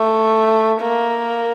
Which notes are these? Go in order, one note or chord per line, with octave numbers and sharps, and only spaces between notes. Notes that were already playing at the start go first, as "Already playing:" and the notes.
Already playing: A3
A#3